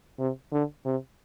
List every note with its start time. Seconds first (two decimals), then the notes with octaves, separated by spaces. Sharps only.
0.19 C3
0.53 D3
0.86 C3